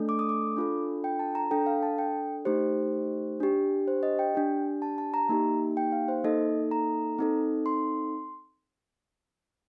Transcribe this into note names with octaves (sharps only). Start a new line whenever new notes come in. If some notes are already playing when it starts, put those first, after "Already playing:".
Already playing: A3 D4 A4
D6
D#6
D6
D4 F4 A4
G5
A5
A#5
D4 A4 G5
F5
A5
G5
A3 D#4 G4 C5
D4 G4
C5
D#5
G5
D4 G4
A5
A5
A#5
A#3 D#4 G4
G5
F5
C5
A#3 D#4 A4 D#5
A#5
C4 D#4 A4
C6